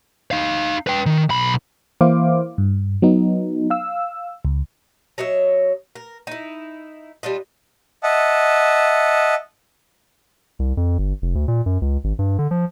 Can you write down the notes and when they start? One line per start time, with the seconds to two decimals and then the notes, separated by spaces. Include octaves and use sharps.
0.31 D#4 F5
0.87 B4 G5
1.06 D#3
1.30 B1 B5
2.01 E3 A#3 E4 C5 F5 D6
2.58 G2
3.02 F#3 B3 D#4
3.70 F5 E6
4.45 C#2
5.18 F#3 C#5 D#5 E5
5.95 A#4
6.27 D#4 E4
7.23 G3 D4 F4 D#5
8.03 D#5 E5 F#5 A5
10.59 C2
10.77 F2
10.98 G1
11.22 F1
11.35 D2
11.48 A#2
11.66 F#2
11.82 C#2
12.04 G#1
12.19 G2
12.38 D3
12.51 F3